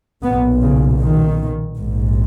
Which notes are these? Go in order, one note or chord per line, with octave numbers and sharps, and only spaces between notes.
B1 A#2 B3
C#3
D#3
A#1 G#2